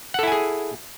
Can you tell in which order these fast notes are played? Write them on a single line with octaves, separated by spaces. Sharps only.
F#5 A4 E4 G#5 G#4